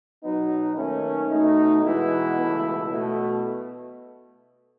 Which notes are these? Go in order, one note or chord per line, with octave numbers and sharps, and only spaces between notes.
B2 F#3 B3 D#4
D#2 D#3 A3 C#4
B2 A3 D#4
B2 E3 G#3 B3 E4
C#2 B2 A3
B2 A3